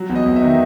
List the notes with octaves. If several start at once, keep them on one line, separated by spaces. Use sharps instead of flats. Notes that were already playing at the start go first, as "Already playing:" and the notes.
Already playing: F#3
E2
D#5
E2
E5
D#3